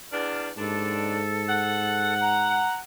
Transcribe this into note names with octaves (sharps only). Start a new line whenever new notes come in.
E2 D4 F6
D#2 G#2 D4 A4
F#5
A#5